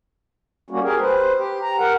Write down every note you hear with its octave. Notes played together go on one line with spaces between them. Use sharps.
G3 A#3 C#4 F#4
G4 G#4 A#4
B4 C5
G4
A#5
A#4 F#5